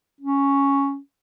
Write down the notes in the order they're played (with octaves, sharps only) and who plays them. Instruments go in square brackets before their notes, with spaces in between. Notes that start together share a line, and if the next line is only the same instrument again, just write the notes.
[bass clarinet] C#4